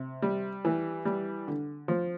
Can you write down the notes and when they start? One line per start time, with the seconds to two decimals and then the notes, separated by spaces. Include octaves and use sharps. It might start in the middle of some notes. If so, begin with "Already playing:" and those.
Already playing: C3
0.22 G3
0.65 E3
1.05 G3
1.48 D3
1.88 F3